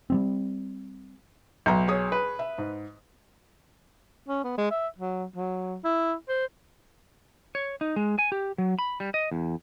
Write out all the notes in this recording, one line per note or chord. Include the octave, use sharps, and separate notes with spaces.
G3 G#3 C4
B1 E5 A#5 G6
G#4 C#5 D#6
B4
E5
G#2
C#4
B3
G#3
E5
F#3
F#3
E4
C5
C#5
D#4
G#3
G#5
G4
F#3
B5
G3
D#5
E2